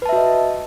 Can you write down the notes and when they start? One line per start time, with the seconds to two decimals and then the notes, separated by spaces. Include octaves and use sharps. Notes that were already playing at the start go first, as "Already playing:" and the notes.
0.02 B4
0.06 A5
0.09 E5
0.13 F#4
0.16 D#5